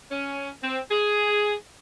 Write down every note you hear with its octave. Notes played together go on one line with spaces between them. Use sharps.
C#4
C4
G#4